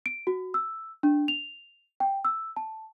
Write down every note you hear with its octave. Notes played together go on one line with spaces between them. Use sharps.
D7
F#4
E6
D4
F7
G5
E6
A5